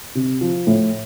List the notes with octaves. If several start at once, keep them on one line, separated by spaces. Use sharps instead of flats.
C3
F3
A2